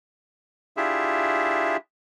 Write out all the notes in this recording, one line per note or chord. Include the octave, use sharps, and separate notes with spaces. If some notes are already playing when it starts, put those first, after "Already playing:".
D4 E4 F4 G4 G#4 E5